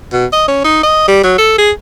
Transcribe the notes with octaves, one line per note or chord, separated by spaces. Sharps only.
B2
D#5
C#4
D#4
D#5
G3
F#3
A4
G#4